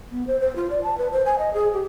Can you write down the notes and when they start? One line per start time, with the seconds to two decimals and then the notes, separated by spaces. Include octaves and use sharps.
0.12 B3
0.27 C5
0.40 C5
0.56 F4
0.70 D5
0.83 A5
0.98 B4
1.12 C5
1.26 G#5
1.39 D#5
1.54 G#4
1.73 G4